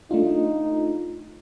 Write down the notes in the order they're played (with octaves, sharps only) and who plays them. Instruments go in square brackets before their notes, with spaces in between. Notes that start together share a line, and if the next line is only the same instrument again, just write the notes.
[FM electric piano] A3 D4 F4 [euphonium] D#4